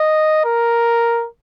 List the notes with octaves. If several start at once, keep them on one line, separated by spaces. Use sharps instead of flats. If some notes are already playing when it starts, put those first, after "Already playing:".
Already playing: D#5
A#4